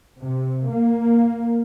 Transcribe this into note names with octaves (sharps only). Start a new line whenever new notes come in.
C3
A#3